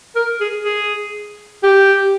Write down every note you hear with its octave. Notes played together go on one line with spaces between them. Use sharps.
A#4
G#4
G#4
G4